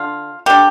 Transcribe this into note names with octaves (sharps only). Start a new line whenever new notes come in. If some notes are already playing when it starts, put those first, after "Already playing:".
Already playing: D3 F4
D3 A#3 G4